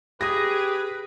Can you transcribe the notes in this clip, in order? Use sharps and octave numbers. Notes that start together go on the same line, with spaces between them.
G4 G#4 B4 D#6 A#6